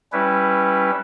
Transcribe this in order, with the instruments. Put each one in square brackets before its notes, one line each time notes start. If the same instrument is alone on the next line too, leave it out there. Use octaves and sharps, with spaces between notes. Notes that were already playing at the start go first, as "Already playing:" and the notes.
[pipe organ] G3 C#4 E4 B4